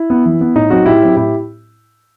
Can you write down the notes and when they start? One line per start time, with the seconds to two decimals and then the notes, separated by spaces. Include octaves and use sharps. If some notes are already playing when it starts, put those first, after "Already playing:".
Already playing: E4
0.10 B3
0.26 E3
0.41 B3
0.55 A2 D#4
0.70 F#3 C4 D#4 F#4
0.86 A2 E4 G4
1.02 F#3 C4
1.16 A2 E4 G4